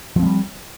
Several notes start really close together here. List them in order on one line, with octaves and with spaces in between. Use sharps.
F3 C4 G#3 G3